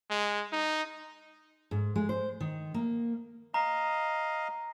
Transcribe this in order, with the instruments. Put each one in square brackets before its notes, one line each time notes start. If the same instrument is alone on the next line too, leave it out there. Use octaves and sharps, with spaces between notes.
[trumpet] G#3
D#4
[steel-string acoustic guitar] G#2
G#3
C5
D#3
A#3
[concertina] D#5 F5 [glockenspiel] A#5